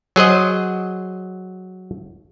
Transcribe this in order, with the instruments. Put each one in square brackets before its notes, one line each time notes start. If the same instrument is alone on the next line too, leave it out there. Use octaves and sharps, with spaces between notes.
[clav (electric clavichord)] F#3 G#4 C5 D#5